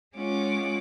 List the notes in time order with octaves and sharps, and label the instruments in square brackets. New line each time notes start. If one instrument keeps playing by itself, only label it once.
[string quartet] G#3 C#4 F4 F#5 D6